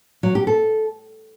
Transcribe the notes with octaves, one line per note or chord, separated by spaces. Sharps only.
F#3
G4
A4